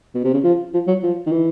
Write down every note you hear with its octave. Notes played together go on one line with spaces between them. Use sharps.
B2
C3
C#3
F3
F3
F#3
F3
D#3
E3